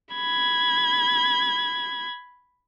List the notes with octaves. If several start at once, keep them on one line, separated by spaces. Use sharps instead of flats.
B5 G#6